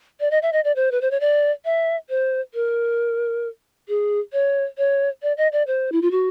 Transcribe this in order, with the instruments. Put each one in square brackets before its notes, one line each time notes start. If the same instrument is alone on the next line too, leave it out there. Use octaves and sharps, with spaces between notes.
[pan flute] D5
D#5
E5
D#5
D5
C5
B4
C5
C#5
D5
E5
C5
A#4
G#4
C#5
C#5
D5
D#5
D5
C5
E4
F4
F#4